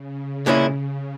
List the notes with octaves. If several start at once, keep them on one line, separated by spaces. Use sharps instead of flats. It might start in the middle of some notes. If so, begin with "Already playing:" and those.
Already playing: C#3
C#3
A#2 G#3 C#4 E4